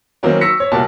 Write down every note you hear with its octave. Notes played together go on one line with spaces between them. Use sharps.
D#3 E3 F#3 A#3 C4 C#4
C#6 E6 A#6 B6 C#7
C#5
G1 C2 A#2 F#4 A5